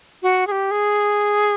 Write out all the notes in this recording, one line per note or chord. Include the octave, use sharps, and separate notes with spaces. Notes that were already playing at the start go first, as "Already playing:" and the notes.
F#4
G#4
G4
G#4